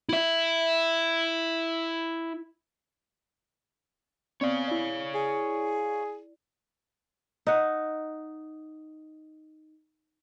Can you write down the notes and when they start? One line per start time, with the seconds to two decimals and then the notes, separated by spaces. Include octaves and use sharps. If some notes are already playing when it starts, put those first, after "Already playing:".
0.09 E4 E5
4.41 B3 C4 C#5 D5 F5
4.68 E4 D5
5.15 G#4
7.47 D#4 F#5